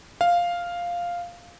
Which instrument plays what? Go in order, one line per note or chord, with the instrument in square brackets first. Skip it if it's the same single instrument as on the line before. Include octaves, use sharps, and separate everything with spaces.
[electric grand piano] F5